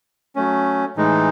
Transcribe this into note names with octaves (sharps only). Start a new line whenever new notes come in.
F#3 A3 C#4
A2 E3 G#3 D#4